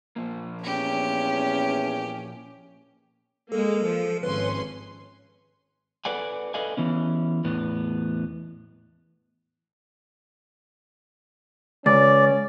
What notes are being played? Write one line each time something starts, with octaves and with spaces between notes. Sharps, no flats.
A#2 F3 A#3
E2 C#4 G4
G#3 A#3 A4
F3
G#1 C#4 B4 C6
A4 B4 D5 F#5 G#5
A4 B4 D5 D#5 F5 G#5
E3 B3 C#4
E2 A2 B3
C#2 C#4 D5